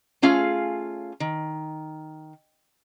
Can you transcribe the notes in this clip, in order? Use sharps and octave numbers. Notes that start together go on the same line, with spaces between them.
A3 C#4 F4 G#4 F5
D#3